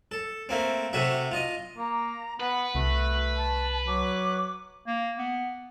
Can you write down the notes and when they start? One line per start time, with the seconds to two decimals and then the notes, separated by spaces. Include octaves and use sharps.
0.12 A4
0.49 A3 A#3 C4
0.93 C3 A3 F#4 E5
1.31 F4 D#5
1.77 A#3 A#5
2.40 B3 B4 F#5
2.75 C2 A3 F#4
3.37 A5
3.87 F#3 D6
4.87 A#3
5.19 B3